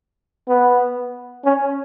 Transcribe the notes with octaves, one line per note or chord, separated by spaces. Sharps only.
B3
C#4